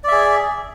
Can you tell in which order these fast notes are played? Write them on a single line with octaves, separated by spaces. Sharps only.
D5 E5 G#4